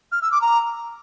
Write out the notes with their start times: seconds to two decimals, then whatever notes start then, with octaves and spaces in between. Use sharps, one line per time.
0.12 F6
0.22 E6
0.32 D6
0.42 A#5